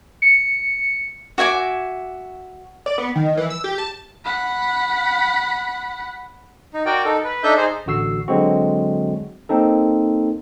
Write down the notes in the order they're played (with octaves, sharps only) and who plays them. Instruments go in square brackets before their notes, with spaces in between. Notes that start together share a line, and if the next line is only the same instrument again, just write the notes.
[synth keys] C#7
[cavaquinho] F#4 E5 G#5 D6
[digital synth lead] D5
B3
D#3
E3
E6
G4
A5
[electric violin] F#5 B5
[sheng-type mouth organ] D#4
F#4 A#4 D5 G5
D#4 A4
B4
D4 D#4 A4 D#5 E5 G6
D#4 G#4 C5
[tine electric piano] A1 D3 F#4 E6 C7
D3 F#3 G#3 C4 F#4
A#3 C4 D#4 A4